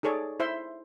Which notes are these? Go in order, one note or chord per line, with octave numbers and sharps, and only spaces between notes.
D#4 G#4 A4 C#5 D5
E4 C5 E5 C6